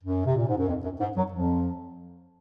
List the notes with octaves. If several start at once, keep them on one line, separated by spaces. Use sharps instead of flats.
F#2
C3
A#2
G#2
F#2
F2
F#2
G#2
F#2 F#3
F2 F3